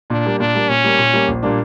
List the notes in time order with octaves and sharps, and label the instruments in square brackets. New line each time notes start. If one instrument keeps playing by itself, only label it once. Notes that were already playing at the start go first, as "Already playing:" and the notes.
[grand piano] A#2 [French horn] D4
[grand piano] G3 A#3
[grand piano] A#2 [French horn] D4
[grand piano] G3 A#3
[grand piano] A#2 [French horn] C#4
[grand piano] G3 A#3
A#2
G3 A#3
A#1
A#2 G3 A#3 D4